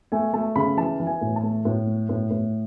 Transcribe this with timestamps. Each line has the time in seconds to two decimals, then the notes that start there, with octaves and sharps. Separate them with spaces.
0.12 A3 G#5
0.33 A3 A5
0.56 C#3 B5
0.77 E3 A5
1.00 E3
1.07 G#5
1.21 A2
1.36 A5
1.43 A3
1.65 A2
1.87 A3
2.09 A2
2.31 A2